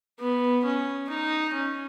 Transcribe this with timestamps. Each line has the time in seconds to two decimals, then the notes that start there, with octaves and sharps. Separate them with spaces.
0.19 B3
0.64 C#4
1.09 D#4
1.53 C#4